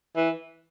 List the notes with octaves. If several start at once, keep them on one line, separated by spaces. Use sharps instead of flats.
E3